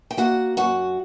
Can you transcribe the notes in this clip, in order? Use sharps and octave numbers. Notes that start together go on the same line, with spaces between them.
G5
A#3 F#4 F#5
F#2 F#4 F#5